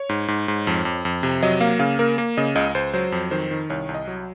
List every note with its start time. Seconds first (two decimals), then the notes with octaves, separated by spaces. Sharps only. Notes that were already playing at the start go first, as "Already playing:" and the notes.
Already playing: C#5
0.09 G#2
0.28 G#2
0.48 G#2
0.67 F2
0.85 F2
1.05 F2
1.23 C3
1.43 F#3 D#5
1.61 A#3 F5
1.79 C#3 F5
1.99 A#3 A#4
2.18 A#3
2.37 C#3 D#5
2.55 C#2 D#5
2.75 C#2 C5
2.94 F#3 C5
3.12 F2
3.31 D#3 C5
3.51 D#3
3.70 C2 C#5
3.89 C2
3.95 D#5
4.08 F#3